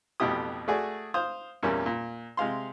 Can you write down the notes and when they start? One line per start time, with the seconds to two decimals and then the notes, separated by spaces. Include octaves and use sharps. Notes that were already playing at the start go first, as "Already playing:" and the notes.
0.20 A1 F2 B2 E4 G4 D#6
0.68 A3 F#4 G#4 D5
1.14 C5 F5 D#6
1.63 E2 A#2 G3 A#3 C#4
1.86 A#2
2.37 C3 G#3 F5 C6